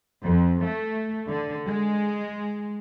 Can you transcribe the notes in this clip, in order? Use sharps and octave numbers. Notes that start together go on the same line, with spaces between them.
F2
A3
D3
G#3